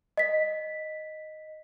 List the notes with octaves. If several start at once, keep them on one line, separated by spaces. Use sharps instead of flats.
D#5 B6